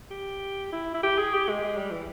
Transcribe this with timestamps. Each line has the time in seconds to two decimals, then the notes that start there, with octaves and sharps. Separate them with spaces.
0.10 G4
0.72 E4
0.94 E4
1.03 G4
1.18 G#4
1.34 G4
1.49 G#3
1.64 G#3
1.77 G3
1.91 E3